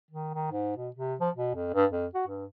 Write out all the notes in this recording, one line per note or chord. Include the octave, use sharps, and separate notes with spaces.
D#3
D#3
G#2
B2
C3
F3
B2
F2
G2
F2
F#4
G2